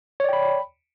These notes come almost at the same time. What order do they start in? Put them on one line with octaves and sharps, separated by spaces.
C#5 D5 G5 B5